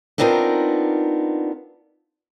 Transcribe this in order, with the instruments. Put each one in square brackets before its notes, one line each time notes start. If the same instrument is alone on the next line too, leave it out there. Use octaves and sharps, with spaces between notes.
[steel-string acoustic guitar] B3 C4 D4 D#4 F4 A#4